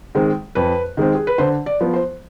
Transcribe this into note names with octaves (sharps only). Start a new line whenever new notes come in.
D#3 G#3 C4
F2 B4
D#3 G#3 C4
G#4
B4
D3 C5
D5
F3 B3
C5